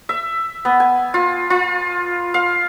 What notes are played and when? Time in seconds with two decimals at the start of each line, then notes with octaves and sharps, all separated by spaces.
0.09 E5
0.65 B3
0.80 G#5
1.14 F4
1.50 F4
2.34 F5